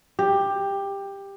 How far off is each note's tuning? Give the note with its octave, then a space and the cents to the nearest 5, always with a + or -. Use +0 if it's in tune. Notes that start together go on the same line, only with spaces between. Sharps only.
G4 +15